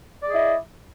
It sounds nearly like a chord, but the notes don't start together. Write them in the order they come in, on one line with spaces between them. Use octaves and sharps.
D5 G#4 D#5 E4